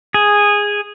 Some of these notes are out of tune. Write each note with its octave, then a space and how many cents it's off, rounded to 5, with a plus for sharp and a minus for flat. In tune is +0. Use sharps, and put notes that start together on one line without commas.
G#4 -10